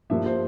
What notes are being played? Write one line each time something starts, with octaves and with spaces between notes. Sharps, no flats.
G2 F3 A#3 E5
C5